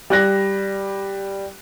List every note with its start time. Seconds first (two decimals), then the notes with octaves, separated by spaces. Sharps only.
0.10 G3 F#6 A#6